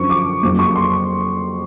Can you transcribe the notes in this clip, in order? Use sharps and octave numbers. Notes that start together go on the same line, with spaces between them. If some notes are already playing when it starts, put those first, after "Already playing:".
Already playing: F#2 D3 F3 C#6
D6
F2 C#3 F#3 A#3 D6
C#6
C6